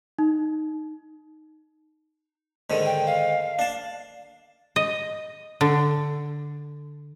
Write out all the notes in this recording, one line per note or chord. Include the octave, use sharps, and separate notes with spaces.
D#4
G#2 D3 D#3
G5
F5
D4 A5
D#5
D3